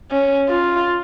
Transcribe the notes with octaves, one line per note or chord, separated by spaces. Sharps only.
C#4
F4